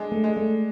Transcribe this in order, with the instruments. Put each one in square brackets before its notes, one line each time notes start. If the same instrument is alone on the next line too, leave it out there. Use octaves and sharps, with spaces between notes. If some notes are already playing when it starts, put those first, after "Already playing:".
Already playing: [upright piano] G#3 D4
[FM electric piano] A3
[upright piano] G#3
[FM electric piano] A3